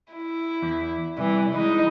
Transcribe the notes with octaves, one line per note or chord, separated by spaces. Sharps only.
E4
E2
C3 E3 G3
E3 G#3 D#4 E4